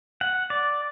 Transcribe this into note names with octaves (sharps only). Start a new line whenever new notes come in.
F#5
D5